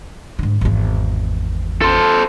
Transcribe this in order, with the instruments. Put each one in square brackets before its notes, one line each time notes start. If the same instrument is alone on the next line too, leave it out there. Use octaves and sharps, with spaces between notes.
[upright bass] G#2 D3
G#1 E2
[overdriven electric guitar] A4 C5